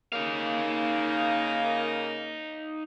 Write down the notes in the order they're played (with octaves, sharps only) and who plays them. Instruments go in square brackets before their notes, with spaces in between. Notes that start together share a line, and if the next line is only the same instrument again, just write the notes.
[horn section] C#3 A#3 [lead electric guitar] D#4 F5